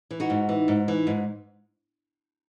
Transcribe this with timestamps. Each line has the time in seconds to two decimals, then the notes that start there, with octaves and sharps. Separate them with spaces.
0.11 E3
0.20 D#4 F#4
0.30 G#2
0.49 E3
0.68 G#2
0.88 E3
1.07 G#2